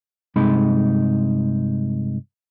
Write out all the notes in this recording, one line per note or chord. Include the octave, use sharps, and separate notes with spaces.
G2 C3 G#3 D#4 B5